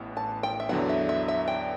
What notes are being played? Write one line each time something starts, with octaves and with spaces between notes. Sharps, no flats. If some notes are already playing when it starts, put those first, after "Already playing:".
Already playing: A1 A2 E3 B3
A5
G5
E5
E2 D3 F#3 B3 D4 F#5
E5
E5
E5
G5